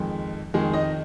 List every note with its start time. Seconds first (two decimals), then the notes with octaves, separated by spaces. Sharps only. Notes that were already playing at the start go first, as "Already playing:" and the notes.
Already playing: F2 D#3 G#3
0.54 F2 D#3 G#3 G#4
0.73 D#4 D#5